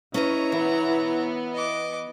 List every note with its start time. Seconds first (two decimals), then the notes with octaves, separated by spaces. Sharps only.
0.14 C#4 E4 B4 C#5 D#5 A#5
0.52 E3 B3
1.54 D#5 D6